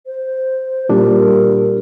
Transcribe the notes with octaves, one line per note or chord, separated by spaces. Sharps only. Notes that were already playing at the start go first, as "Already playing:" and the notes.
C5
A#2 G3 D4 A#4